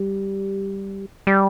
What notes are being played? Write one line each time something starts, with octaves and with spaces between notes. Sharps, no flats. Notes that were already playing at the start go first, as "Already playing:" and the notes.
Already playing: G3
G3